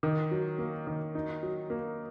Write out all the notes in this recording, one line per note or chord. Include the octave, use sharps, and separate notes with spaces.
D#3
F#3
A#3
D#3
D#4
F#3
A#3